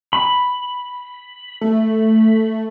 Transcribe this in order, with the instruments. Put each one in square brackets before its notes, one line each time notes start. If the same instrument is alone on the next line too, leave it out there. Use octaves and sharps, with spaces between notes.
[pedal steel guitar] B5
[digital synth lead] A3